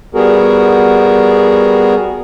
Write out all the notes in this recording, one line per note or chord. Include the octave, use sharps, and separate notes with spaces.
G3 B3 F#4 G#4 A#4